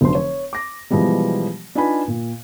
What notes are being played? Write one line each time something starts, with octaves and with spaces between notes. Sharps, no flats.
F1 D3 F#3 C5 C6
C#5
D6 A#6
B2 E3 F3 G3 G#3
D4 D#4 F4 B4 G#5 B5
A#2